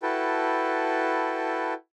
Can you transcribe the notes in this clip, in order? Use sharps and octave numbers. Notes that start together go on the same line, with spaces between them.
E4 F#4 A4 B4 G5 A5